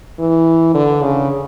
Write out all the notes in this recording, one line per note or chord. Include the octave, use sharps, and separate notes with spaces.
E3
D3
C#3